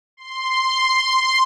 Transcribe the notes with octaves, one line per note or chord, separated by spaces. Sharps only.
C6